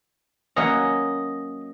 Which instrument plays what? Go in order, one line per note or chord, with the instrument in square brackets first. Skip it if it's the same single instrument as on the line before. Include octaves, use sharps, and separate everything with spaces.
[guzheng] F#3 A#3 C#4 [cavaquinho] D#5